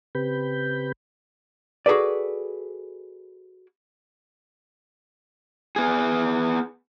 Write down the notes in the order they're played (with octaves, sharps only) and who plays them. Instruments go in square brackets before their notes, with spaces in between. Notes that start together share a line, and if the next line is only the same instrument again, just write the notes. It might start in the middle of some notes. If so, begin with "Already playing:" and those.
[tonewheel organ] C#3 C4 G4 B4 B5 G6
[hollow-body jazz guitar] F#4 G#4 A4 B4 D5
[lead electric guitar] B3 G#4